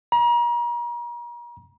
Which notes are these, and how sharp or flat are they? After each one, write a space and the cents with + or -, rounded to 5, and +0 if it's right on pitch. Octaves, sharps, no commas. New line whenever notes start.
A#5 +40